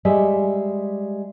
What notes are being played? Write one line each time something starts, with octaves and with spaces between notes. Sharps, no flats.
G3 G#3 E5